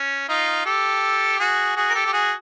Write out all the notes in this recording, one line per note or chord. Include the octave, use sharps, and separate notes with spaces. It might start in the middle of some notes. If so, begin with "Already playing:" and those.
Already playing: C#4
D#4 F4
G4 A4
F#4 G#4
F#4 G#4
A#4
G4 A4
G4
F#4 G#4